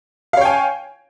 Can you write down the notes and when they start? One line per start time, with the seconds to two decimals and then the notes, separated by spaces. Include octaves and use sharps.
0.33 F5
0.37 C#5
0.41 G5
0.45 G#5